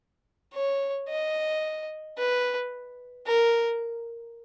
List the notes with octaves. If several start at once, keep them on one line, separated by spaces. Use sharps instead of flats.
C#5
D#5
B4
A#4